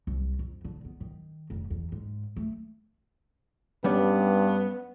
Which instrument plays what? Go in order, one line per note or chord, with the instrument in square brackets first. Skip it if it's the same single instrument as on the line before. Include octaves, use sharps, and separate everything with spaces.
[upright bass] C2
F2
D3
B3
D#3
F1
E2
G#2
A3
[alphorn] G2 [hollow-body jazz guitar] G3 C#4 D5 [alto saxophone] B3